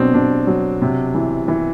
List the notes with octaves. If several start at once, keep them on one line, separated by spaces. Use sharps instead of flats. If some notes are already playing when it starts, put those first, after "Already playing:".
Already playing: B2 F#3 C4 D4
B2 D4
F#3
C3
E3
E3